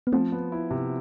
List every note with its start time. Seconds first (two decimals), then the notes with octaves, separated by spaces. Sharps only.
0.07 B3
0.12 F3 A3 C4
0.32 B3
0.52 E4
0.71 C3